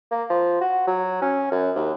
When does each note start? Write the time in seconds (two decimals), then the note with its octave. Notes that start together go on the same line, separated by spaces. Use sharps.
0.11 A#3
0.30 F3
0.61 F#4
0.87 F#3
1.22 C#4
1.52 F#2
1.76 D#2